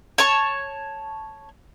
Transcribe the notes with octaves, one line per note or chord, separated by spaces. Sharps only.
C#5 A5 C#6